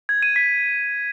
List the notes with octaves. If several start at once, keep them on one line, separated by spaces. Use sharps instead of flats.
G#6
D#7
B6